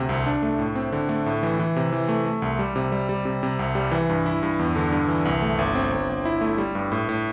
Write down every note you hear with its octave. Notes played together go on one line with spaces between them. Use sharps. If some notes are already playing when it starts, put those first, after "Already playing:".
Already playing: D2 C3
C2
D4
A3
A2
C4
D3
A3
A2
E3
E3
C3
E3
A3
A3
C2
G3
C3
G3
G3
C3
C3
C2
G3
E3
G2
E4
G2
E2
D3
G2
E3
C2
A3
G1
C4
G1
G1
E4
A3
G3
G2
A2
A2